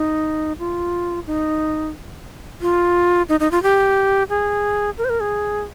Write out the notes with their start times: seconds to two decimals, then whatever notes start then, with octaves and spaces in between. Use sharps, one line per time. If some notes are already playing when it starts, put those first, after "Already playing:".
Already playing: D#4
0.59 F4
1.27 D#4
2.62 F4
3.29 D#4
3.40 D#4
3.51 F4
3.63 G4
4.29 G#4
4.98 A#4
5.05 C5
5.09 A#4
5.20 G#4